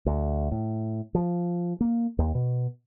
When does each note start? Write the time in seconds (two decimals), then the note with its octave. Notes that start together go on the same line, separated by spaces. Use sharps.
0.06 D2
0.52 A2
1.15 F3
1.81 A#3
2.19 D#2
2.35 B2